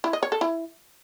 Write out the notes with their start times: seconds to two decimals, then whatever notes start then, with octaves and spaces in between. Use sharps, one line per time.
0.04 E4
0.13 D#5
0.23 C#5
0.32 A4
0.41 E4